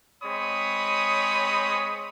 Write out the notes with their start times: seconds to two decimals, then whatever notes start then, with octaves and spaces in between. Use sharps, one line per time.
0.23 G#3 C4 C#5 B5 D#6